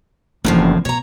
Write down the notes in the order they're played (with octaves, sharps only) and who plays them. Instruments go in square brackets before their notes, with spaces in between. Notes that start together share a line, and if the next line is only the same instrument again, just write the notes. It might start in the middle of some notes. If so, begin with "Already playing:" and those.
[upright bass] F#1 D4 [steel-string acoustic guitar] E2 A2 F3
[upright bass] B2 [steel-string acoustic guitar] C#5 A#5